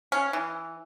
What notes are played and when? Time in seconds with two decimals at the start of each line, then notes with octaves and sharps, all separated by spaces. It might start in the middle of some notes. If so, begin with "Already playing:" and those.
0.12 C#4
0.33 E3